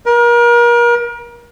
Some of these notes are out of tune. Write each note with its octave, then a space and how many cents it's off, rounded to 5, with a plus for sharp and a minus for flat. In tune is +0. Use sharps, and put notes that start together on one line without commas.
A#4 +35